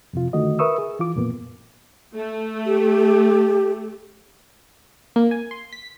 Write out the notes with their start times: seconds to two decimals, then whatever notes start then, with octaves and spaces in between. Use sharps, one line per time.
0.13 F2 C3 F4
0.33 D3 D#3 A3 F#4 D#5
0.59 A#4 B4 E5 C#6 D#6 E6
0.78 G#4
0.99 E3 F4 D6
1.15 F2 A#2 A#3 B3
2.15 A3
2.66 G4
5.16 A#3
5.31 G#5
5.51 C6
5.73 B6